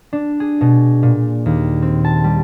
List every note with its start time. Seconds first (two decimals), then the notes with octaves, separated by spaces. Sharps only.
0.13 D4
0.40 G#4
0.61 B2
1.03 A#2
1.46 D#2
1.82 C4
2.04 A5
2.24 G3